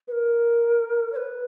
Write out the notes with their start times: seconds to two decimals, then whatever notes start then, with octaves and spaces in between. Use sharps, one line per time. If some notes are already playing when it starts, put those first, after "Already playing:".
0.08 B4
0.12 A#4
1.12 C#5
1.16 B4